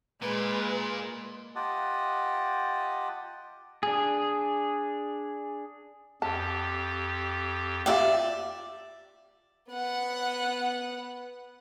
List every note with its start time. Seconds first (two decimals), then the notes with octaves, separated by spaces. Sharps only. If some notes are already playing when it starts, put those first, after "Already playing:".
0.22 A#2 G#3 B4
1.56 F4 G4 D#5 F#5 A5
3.83 D4 G#4
6.22 F2 G4 A5
7.86 F4 G4 D5 E5 G5
9.70 B3 F#5